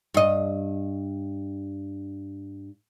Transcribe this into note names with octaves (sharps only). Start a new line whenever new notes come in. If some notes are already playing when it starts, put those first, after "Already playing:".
G2 D#5